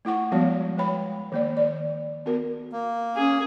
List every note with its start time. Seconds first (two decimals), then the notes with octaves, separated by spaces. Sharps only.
0.05 A3 E4 F#5 C#6
0.31 F3 G3 G#3 B3 F#4 C#5
0.78 G#3 B4 C#5 G5 B5
1.32 D#3 A#3 D5
1.57 D5
2.26 B3 F#4 A#4
2.72 A#3
3.17 C#4 G#4